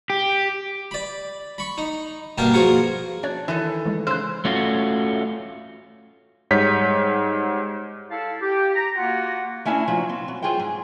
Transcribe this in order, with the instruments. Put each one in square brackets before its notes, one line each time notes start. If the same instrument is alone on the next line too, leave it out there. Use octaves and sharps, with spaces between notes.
[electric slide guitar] G4
[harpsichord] D5 B5
B5 C#6
D#4
G2 B2 A#3 A#4 G5 A5
F3 F#4 G#4 A#4 C#6
[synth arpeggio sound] C#4 C#5 [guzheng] D4
[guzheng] D#3 A4 D#5 [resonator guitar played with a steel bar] E3
[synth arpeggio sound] E3 G#3
[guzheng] C#3 [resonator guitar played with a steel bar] C5 [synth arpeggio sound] E6 F#6
[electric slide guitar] A3 C#4 F4 F#4
[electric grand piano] G#2 G3 C#5 G6 B6
[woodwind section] E4 A4 F5 A5
G4
A#5
A#3 F4 F#4 F#5
[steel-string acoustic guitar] A3 C#4 D4 E4 G5 G#5
F3 F#3
C4
F#3
F#3 F4 G#4 C5 G5
G#2